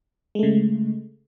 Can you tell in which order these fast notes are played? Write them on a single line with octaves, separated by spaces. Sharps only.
G#3 A3 C#3